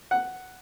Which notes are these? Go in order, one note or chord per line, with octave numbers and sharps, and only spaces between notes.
F#5